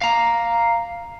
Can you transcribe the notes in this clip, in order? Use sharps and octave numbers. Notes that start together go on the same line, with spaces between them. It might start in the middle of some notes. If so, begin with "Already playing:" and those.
F5 A#5